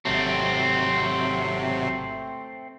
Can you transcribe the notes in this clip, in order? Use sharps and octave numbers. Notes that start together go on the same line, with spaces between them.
G#1 C3 F#3 A3 C4